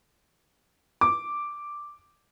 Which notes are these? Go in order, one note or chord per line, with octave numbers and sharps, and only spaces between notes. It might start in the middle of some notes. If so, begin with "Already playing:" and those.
D6